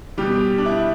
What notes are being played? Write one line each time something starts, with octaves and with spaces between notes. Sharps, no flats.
B2 G3 G4
D4
E4